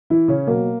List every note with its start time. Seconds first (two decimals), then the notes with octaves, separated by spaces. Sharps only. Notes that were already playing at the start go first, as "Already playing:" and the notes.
0.10 E3 E4
0.28 C#3 C#4
0.47 B2 F#3 A#3